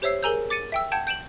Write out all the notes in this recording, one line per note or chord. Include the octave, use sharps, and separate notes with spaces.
G4 C5 C#5 E5 E6 C7
G#4 A#4 G#5 A#5 E6 G6
D6 A6 C#7 D#7
E5 G5 E6
F#5 G5 A5 G6 G#6
G6 D7 E7 F#7